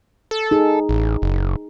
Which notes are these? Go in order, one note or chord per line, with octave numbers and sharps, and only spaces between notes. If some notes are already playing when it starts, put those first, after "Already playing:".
A4
D#4 G#4
A1
F#1